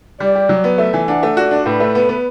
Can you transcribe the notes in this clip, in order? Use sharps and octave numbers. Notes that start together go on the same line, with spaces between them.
G3 D5
G4
F#3
B3
A3 E5
E3
D4 F#5
A3
F#4 D5
D4
A2 B4
A3
B3
B3